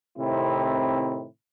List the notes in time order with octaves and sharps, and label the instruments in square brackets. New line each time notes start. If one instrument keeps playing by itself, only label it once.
[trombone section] A2 C3 D#3 C4 E4